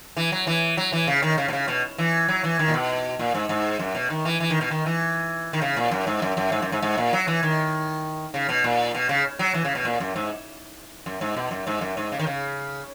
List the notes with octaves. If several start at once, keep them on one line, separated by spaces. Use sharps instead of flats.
E3
F#3
E3
F#3
E3
C#3
D#3
C#3
B2
C#3
B2
E3
F#3
E3
D#3
A#2
B2
A#2
G#2
G#2
F#2
B2
D#3
E3
E3
D#3
B2
D#3
E3
D#3
C#3
A#2
F#2
G#2
F#2
F#2
G#2
F#2
G#2
G#2
A#2
F#3
E3
D#3
C#3
B2
A#2
B2
C#3
F#3
E3
C#3
B2
A#2
F#2
G#2
F#2
G#2
B2
F#2
G#2
F#2
G#2
C#3
D#3
C#3